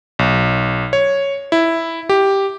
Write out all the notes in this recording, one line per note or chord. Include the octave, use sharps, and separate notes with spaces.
B1
C#5
E4
G4